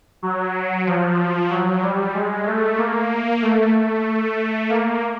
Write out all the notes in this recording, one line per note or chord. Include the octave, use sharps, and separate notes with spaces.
F#3
F3
F#3
G3
G#3
A3
A#3
A3
A3
A#3